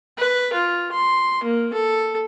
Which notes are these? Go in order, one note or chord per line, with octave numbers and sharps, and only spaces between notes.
B4
F4
C6
A#3
A4